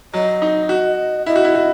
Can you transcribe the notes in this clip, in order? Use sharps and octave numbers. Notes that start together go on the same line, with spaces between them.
F#3 D#5
D#4
F#4
E4 D#5
F#4
E4
F#4